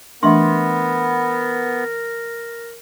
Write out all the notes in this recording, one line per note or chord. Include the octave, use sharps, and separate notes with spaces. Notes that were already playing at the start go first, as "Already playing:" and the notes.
E3 A3 B3 D4 A#4 E5 C6